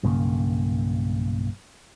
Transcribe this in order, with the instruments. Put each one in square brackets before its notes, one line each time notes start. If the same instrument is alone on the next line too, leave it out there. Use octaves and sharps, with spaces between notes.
[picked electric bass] B1 G2 C#3 A#3